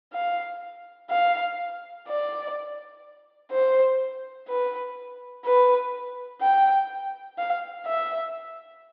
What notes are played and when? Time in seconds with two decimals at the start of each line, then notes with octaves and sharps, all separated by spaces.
0.13 F5
1.10 F5
2.07 D5
3.52 C5
4.48 B4
5.45 B4
6.41 G5
7.38 F5
7.87 E5